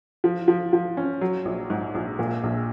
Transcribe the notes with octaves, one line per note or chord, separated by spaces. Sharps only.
F3
F3
F3
C#4
F#3
A#1
G#2
A#1
A#2
A#1